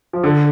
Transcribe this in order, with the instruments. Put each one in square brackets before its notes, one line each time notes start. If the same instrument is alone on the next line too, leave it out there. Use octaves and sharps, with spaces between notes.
[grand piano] F3
[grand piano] D3 [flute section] A4